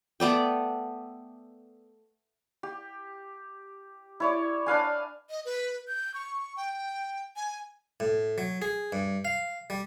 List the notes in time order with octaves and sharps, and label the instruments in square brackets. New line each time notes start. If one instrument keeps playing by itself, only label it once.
[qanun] A3 B3 D5 G5
[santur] G4
E4 C#5 D5
D4 B4 F5 G#5
[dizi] D#5
B4
G6
C#6
G5
G#5
[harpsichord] A2
F#3
G#4
G2
F5
G3